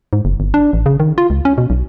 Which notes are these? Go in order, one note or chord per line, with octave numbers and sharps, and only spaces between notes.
G#2
F#1
G1
D4
A1
C#3
D#3
F4
C#2
C#4
B2
B1